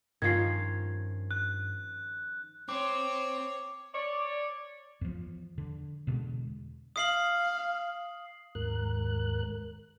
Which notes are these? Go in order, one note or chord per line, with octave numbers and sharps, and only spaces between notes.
G2 D#3 F3 C#4 G#6 C7
F#6
C4 C#5 D6
C#5 D5
E2 F3
D3
E2 B2 D3 G#3
F5 D#6 C7 F#7
D#2 G#2 A#4 F#6